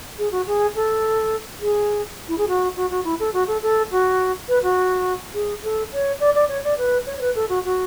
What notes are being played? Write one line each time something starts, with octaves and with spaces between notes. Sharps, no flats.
G#4
F#4
G#4
A4
G#4
E4
G#4
F#4
F#4
F#4
E4
A4
F#4
A4
A4
F#4
B4
F#4
G#4
A4
C#5
D5
D5
C#5
D5
B4
C#5
C#5
B4
A4
F#4
F#4